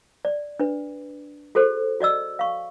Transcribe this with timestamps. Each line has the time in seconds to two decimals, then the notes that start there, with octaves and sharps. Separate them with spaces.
0.25 D5
0.59 D4 B4
1.55 F#4 G#4 A4 C5
2.01 F#4 D5 D#5 E6
2.39 F5 C#6